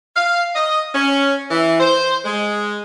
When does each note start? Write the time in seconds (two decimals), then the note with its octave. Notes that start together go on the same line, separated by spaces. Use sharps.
0.15 F5
0.55 D#5
0.94 C#4
1.50 E3
1.79 C5
2.25 G#3